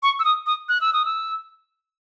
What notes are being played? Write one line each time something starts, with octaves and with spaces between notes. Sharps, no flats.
C#6
E6
D#6
D#6
F#6
E6
D#6
E6